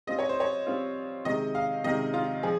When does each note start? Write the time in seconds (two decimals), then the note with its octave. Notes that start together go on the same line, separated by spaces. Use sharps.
0.07 G3 C4 F4 D#5
0.19 C#5
0.29 C5
0.40 C#5
0.67 G3 C4 F4
1.25 C3 D#3 G#3 D#5
1.55 F5
1.84 C3 D#3 G#3 D#5
2.14 F4
2.43 F3 G#4